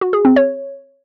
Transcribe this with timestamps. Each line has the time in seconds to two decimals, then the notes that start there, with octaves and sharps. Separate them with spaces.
0.01 F#4
0.13 G#4
0.25 C4
0.36 C#5